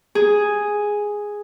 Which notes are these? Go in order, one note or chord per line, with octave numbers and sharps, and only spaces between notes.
G#4